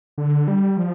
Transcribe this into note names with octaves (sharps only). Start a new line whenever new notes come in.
D3
G3
F3